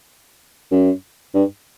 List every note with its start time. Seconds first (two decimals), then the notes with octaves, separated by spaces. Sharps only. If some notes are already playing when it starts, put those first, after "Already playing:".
0.72 F#2
1.34 G2